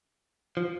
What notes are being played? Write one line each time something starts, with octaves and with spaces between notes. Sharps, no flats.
F3